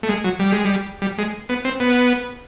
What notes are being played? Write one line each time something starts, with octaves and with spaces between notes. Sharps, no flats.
A3
G#3
F#3
G3
G#3
G3
G3
G#3
B3
C4
B3